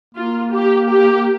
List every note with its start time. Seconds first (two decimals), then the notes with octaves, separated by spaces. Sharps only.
0.15 A#3 F4
0.51 G4
0.88 G4